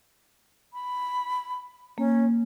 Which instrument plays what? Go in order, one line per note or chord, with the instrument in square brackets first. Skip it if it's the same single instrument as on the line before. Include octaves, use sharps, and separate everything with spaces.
[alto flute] B5
[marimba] A#3 [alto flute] C#4